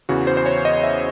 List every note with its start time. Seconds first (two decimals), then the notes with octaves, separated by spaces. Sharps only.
0.09 E2 C#3 E3 F#4
0.27 C5
0.37 C5
0.46 C#5
0.65 D#5
0.83 E5